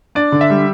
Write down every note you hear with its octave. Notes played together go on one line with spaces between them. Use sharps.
D4 D5
D3
E5
G3